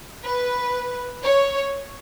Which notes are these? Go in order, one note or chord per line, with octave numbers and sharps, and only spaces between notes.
B4
C#5